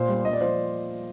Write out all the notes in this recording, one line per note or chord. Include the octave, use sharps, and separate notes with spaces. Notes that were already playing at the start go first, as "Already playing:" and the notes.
Already playing: A#2 C5
G3
A#2 D#5
D5
F3 C5